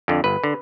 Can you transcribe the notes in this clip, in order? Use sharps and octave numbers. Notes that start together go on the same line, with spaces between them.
F2 D3
G1 B4
D3